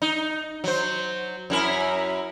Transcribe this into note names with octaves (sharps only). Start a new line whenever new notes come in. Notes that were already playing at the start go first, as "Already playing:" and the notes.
D#4
F#3 C5
F#2 E4 A#4